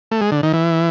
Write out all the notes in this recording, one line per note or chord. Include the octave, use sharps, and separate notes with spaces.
A3
G#3
D3
D#3
E3